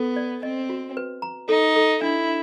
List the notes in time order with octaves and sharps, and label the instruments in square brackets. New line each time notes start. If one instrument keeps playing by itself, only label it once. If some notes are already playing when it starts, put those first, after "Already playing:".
Already playing: [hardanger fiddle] B3 [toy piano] A4
[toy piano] D5
[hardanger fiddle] C4 [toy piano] D#5
[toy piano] F#4
B4
A#5
[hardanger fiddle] D#4 [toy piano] A4
[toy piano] A4
[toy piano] D4 [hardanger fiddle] E4